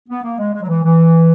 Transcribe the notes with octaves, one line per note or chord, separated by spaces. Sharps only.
B3
A#3
G#3
G#3
F#3
E3
E3